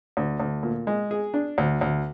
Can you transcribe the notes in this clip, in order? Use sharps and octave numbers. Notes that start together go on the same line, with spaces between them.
D2
D2
A#2
G#3
G#4
D4
D2
D2